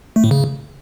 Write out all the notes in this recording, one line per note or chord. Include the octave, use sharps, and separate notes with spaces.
A3
A2
C#3